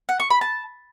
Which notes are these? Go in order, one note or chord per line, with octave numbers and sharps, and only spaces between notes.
F#5
C#6
B5
A5